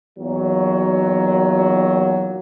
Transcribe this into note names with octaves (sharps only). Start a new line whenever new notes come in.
E2 A#2 D#3 F#3